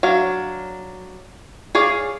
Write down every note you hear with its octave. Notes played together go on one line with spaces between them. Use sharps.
F#3 D4 F5
G#4 C#5 D5 F5